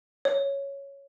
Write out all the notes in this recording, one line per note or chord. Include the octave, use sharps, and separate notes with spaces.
C#5